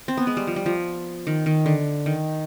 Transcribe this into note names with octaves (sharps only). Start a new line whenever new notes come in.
C4
B3
G#3
G3
F3
G3
F3
D#3
D#3
D3
D#3